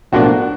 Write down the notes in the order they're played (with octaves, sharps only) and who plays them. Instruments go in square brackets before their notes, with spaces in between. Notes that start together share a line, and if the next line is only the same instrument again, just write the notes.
[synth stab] B1 A2 F3 A#3 D4 [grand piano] F#4